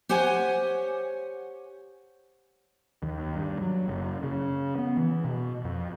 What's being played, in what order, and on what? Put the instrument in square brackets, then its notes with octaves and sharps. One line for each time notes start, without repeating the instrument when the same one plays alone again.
[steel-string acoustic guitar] G4 C5 C#5 F#5 G#5
[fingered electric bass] D#2
G2
F#3
F#1
C#3
B3
E3
B2
F2